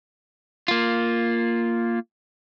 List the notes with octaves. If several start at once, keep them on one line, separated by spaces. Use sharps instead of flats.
A#3 F4